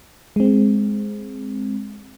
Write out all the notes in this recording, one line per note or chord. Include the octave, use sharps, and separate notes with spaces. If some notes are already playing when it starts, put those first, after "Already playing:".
G#3 C4